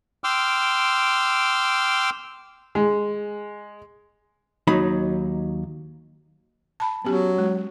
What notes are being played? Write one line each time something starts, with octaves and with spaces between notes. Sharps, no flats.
G5 C6 D6 E6 F6
G#3
D#2 F#3 D#4 B5
A5 B5
F#3 B3 C#4 G4
G#3